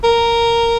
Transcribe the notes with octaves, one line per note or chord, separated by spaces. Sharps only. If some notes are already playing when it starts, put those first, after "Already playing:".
A#4